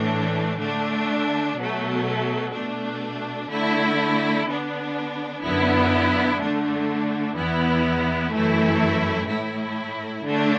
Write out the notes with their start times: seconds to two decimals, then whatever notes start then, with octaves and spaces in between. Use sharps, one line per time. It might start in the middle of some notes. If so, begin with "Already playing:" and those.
Already playing: A2 E3 A3 D4
0.60 D3 A3 D4
1.57 B2 F#3 A3
2.54 B2 A3 D4
3.49 D3 A3 E4
4.46 D3 B3 D4
5.42 F#2 D3 B3 E4
6.38 D3 A3 D4
7.35 E2 E3 B3 E4
8.31 F#2 E3 A3 E4
9.28 A2 A3 E4
10.25 D3 A3 D4